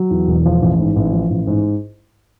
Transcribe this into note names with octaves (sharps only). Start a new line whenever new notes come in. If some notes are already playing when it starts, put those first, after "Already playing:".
Already playing: F#3
E2
E1
F3
A1
G#2
A1
F3
A1
G#2